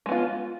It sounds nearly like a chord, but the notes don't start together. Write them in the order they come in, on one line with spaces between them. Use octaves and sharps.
G#3 B3 F4